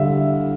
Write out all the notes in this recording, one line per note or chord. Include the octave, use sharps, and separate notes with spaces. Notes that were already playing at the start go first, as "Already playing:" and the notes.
Already playing: D3 G3 E5 F5